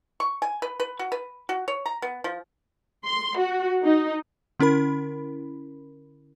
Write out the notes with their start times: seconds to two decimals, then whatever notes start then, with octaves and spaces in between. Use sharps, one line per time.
0.20 C#6
0.42 G#5
0.62 B4
0.80 B4
0.99 F#4
1.12 B4
1.49 F#4
1.68 C#5
1.86 A#5
2.02 B3
2.24 F3
3.04 C6
3.38 F#4
3.83 D#4
4.60 D3 C#4 E4 A#4 B5